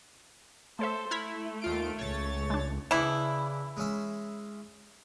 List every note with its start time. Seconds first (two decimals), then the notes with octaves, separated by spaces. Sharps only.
0.79 A3 A4 C5 C#5 E5
1.11 A3 E4 F6 G#6 B6
1.62 D#2 F4 D7
1.98 C#2 C#5 A6
2.50 G#3 D4
2.91 C#3 E3 D4 E4
3.77 G#3 C#4 E5